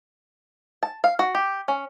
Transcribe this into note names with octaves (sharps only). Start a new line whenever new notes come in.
A5
F5
F#4
G4
C#4